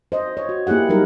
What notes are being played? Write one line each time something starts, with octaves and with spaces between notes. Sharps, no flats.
C5 D#5
C#5
F#4
A#3 E4 G4 G#4 F#5
F#3 G3 D#4 A#4